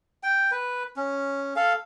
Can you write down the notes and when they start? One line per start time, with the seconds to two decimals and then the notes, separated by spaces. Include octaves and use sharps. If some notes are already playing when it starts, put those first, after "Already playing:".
0.23 G5
0.51 B4
0.96 C#4
1.56 A4 F5